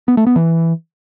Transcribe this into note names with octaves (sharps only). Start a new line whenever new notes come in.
B3
A3
B3
E3